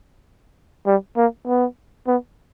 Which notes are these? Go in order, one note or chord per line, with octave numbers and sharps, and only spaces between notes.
G3
A#3
B3
B3